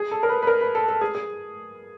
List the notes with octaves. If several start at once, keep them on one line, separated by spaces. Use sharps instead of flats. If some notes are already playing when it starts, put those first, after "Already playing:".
Already playing: G#4
A4
A#4
B4
B4
A#4
B4
A4
A4
G#4
G#4